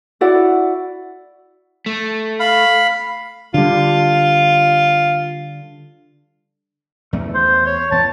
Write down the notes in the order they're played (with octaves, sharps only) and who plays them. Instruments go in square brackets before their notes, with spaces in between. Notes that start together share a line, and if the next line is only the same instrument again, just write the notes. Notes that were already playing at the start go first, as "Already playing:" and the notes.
[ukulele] E4 F#4 D5 F#5
[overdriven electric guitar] A3
[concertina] F5 B5
[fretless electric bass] D3 G3 [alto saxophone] F4
[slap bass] E2 A3
[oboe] C5
C#5
[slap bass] E2 [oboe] A5